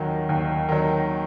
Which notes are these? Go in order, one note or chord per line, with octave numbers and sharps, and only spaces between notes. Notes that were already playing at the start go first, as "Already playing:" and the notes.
Already playing: D#2 D#3 F#3
D#2
D#3 F#3